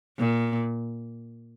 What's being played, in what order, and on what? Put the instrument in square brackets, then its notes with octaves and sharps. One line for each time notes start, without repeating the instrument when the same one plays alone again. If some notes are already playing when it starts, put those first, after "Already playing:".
[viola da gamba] A#2